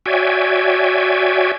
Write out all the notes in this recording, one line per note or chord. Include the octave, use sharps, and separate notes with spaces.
F#4 C#5 D5 E5 G5 G#5